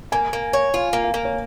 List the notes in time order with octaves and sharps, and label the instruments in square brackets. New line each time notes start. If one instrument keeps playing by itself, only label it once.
[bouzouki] A#3 [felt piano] G#5
[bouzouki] A#3
C#5
[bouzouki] F4 [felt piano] F5
[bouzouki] A#3
[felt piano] F5
[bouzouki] A#3
[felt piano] C#5